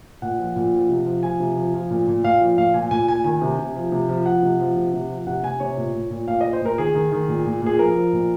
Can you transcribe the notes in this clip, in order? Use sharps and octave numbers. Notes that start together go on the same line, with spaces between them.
A#2 F#5
F3
A#2
F3
C3
F3
F3 G#5
C3
F3
F3
A#2
A#2
A#2 F5
F3
A#2 F5
A#2 G#5
A#2 G#5
A#2 G#5
D#3 G#5
C3
C3
F3
C3
F3
F3 F#5
C3
F3
C3
C3
F3
C3 F#5
C3 G#5
C3 C#5
A#2
A#2
A#2
A#2 F5
A#2 D#5
C5
A#2 A#4
D#3 G#4
D#3
D#3
A#2
A#2
A#2 G#4
F3 A#4
F3
A#2